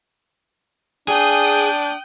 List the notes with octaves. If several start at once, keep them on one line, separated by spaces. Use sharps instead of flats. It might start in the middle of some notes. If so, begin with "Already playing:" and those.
D4 G#4 G5 D#6 F#6